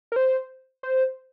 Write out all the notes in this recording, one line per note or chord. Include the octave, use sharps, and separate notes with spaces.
A#4
C5
C5